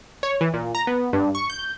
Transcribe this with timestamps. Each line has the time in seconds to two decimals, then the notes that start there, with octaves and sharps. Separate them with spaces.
0.23 C#5
0.41 E3
0.54 A#2
0.75 A#5
0.87 B3
1.13 G2
1.35 C#6
1.50 G6